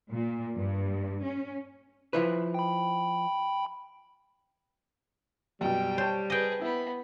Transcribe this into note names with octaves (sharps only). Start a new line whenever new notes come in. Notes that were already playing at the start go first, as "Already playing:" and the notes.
A#2
G2
C#4
F3 E4 B4
G5 B5
F#2 B2 G3 G5
C5 C#5 A5
G#4 B4 D#5 G5
B3 E4 B5